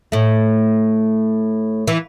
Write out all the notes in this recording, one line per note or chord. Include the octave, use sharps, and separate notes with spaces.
A2 A3
E3